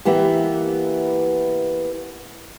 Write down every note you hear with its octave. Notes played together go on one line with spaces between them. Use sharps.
E3 A#3 B3 G4 E5